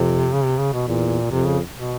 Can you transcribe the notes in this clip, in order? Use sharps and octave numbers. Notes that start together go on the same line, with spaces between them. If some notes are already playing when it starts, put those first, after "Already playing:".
Already playing: F2 C3
C#3
C3
C#3
B2
E2 A#2
F2 C3
C#3
B2